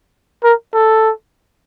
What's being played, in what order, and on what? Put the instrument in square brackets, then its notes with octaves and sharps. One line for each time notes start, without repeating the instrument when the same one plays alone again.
[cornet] A#4
A4